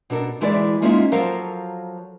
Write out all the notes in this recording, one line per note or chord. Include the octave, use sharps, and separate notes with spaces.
B2 D4 A4 A#4
D2 E3 G#3 E4 B4 D5
G#3 A#3 C#4 D#4 F4 E5
F3 F#3 A4 A#4 F5